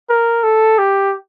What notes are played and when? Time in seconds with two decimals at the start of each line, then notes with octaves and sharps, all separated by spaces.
0.09 A#4
0.43 A4
0.78 G4